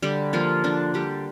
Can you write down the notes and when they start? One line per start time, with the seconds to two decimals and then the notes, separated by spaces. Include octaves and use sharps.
0.02 D3 G3 G4
0.33 F3 A#3 F4
0.64 D3 D4
0.94 D3 G3 G4